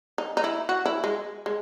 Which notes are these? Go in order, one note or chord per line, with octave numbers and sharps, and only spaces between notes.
D#4
D#4
E4
F#4
E4
G#3
G#3